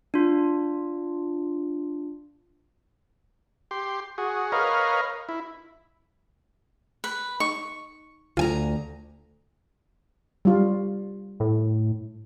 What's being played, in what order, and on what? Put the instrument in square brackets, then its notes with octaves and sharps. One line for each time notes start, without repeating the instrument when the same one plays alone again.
[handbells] D4 F4
[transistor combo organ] G4 C6
F#4 G#4
A#4 B4 C#5 D#5 F5
E4
[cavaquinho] B4
[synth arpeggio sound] D#4 [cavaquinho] C#6
[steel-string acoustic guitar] D2 G#5 A#5 [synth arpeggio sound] F4
[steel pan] G3 F4
[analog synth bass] A2